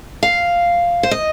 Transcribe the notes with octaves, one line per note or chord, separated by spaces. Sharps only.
F5
C5
D#5